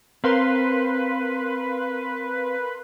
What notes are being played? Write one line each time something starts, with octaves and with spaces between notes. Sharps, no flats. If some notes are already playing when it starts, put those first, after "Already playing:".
C4 A#4 B4 F5 C6